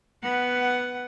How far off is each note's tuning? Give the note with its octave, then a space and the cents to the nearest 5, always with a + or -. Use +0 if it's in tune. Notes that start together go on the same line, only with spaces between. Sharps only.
B3 +0 F#5 +10